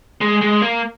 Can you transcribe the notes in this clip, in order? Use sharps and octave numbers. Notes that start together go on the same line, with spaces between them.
G#3
G#3
A#3